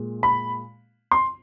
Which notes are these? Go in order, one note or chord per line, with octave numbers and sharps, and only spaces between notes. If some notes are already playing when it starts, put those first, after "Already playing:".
Already playing: A#2 G#3
B5
C6